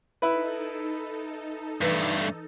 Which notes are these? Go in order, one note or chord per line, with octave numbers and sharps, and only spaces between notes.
D#4 E4 A4 B4
G2 E3 A3 B4